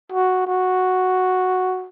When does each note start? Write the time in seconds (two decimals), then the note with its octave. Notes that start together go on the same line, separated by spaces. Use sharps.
0.12 F#4
0.47 F#4